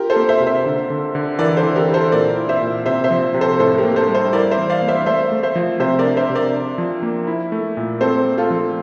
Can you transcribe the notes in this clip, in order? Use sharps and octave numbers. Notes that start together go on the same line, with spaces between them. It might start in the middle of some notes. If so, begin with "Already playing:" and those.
Already playing: F4 G4 A#4
A4 C5
A#3
C5 E5
C3
C5 E5
D3
D3
D3
E3 A#4 D5
A4 C5
E3
G4 A#4
E4
A4 C5
A#2 A#4 D5
E4
C5 E5
A#2
C3 C5 E5
C5 E5
F3
C3
A4 C5
A2 A4 C5
G4 A#4
A#3
A4 C5
G3
A4 C5
E4 A#4 D5
C5 E5
E3
D5 F5
A#3
C5 E5
A3 C5 E5
A3
C5 E5
F3
C3 C5 E5
A#4 D5
D4
C5 E5
C3
A#4 D5
D4
F3
A#3
E4
A3
A#2
C4 A4 C5
A3
F4 A4
F3